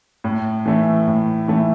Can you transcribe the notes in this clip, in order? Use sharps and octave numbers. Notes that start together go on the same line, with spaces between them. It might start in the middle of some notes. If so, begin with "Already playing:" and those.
A2
E3 A3 E4
A2
E3 A3 E4